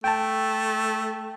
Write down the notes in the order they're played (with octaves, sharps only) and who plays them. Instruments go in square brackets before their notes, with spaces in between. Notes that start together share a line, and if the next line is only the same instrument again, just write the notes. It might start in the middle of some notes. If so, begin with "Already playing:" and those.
[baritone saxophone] A3 [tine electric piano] G5 A5